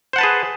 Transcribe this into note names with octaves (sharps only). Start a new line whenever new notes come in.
G#4 B4 C5 F#5 A5